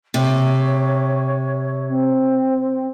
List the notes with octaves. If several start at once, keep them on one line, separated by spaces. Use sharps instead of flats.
C3 C#5
C4